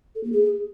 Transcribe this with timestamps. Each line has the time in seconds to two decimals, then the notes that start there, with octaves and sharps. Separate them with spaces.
0.15 A4
0.24 A#3
0.32 G#4